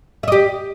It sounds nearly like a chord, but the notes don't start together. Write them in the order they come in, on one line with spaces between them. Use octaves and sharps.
E5 D#5 G4